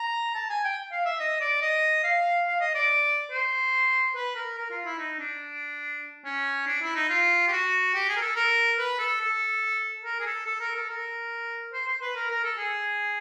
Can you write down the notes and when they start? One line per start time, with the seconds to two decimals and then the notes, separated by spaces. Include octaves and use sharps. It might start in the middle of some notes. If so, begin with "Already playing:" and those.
Already playing: A#5
0.35 A5
0.50 G#5
0.64 G5
0.92 F5
1.05 E5
1.20 D#5
1.41 D5
1.61 D#5
2.04 F5
2.47 F5
2.61 D#5
2.75 D5
3.31 C5
4.15 B4
4.36 A#4
4.57 A#4
4.70 F4
4.85 E4
4.98 D#4
5.19 D4
6.25 C#4
6.67 D4
6.82 E4
6.95 D#4
7.09 F4
7.48 G4
7.52 F#4
7.94 G4
8.09 G#4
8.16 A#4
8.21 A4
8.36 A#4
8.79 B4
8.99 A4
9.21 A4
10.05 A#4
10.20 G#4
10.26 A4
10.47 A4
10.60 A#4
10.75 A4
10.89 A#4
11.73 C5
11.87 C5
12.02 B4
12.15 A#4
12.30 A#4
12.44 A4
12.58 G#4